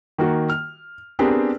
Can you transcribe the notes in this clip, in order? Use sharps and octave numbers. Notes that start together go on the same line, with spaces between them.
D#3 A#3 F#4
F6
B3 C4 D4 G4 G#4 A#4